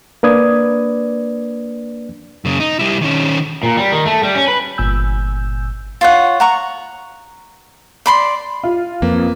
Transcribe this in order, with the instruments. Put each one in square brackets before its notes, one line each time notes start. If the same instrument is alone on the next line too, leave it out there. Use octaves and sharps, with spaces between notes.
[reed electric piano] A#3 D4 B4 D5 D#6 G#6
[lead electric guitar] F#2 C#3
D#4
G3 E4
D#3 C#4
[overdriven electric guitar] A#2
G3
D#3
A3
G3
C#4
B4
[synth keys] G1 A#2 G#5 E6 G6
[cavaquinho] F4 C#5 F#5
F#5 A#5 C#6
D5 B5 C6
[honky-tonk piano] F4
[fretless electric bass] F2 [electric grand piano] A#3 B4